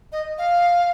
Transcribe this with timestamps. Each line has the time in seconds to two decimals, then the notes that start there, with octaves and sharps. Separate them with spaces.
0.12 D#5
0.38 F5